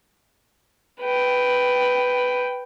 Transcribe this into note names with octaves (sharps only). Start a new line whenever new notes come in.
B4 G5